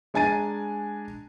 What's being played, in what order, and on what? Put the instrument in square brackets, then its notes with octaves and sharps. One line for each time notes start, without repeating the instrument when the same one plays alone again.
[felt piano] G#3 D4 G#5 A#5 A6 D#7